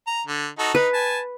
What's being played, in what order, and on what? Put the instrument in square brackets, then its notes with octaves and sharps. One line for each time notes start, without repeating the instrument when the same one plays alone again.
[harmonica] A#5
D3
D#4 F#4 A4
[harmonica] D#4 [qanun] B4
[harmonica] G#5 A5